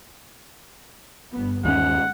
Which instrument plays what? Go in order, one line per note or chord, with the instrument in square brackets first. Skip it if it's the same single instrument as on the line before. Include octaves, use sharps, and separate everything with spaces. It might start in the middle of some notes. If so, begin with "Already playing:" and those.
[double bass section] G1 B3
[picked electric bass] D#2 C#4 [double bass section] G#3 [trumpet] F#5